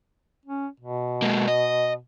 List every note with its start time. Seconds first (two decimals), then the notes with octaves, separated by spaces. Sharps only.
0.46 C#4
0.80 B2
1.22 G#3 A#3
1.48 D#5